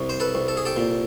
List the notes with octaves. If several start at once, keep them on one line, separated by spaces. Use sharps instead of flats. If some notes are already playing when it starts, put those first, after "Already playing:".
Already playing: C2
C5
A4 B4
C2
A4
G#4
G4 A4
A#2